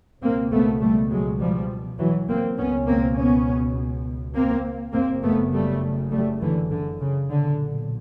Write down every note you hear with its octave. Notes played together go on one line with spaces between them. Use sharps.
C#2 B2 A#3 C4
A3 B3
G3 A3
F#3 G#3
F3 G3
E3 F#3
A#3 C4
C#2 B2 B3 C#4
A#3 C4
B3 C#4
A#3 C4
F#1 F#2 C#3 A#3 C4
A3 B3
G3 A3
G3 A3
D3 E3
D3
C#3
B1 A#2 D3